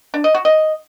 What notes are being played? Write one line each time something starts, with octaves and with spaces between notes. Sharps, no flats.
D4
D#5
F#4
D#5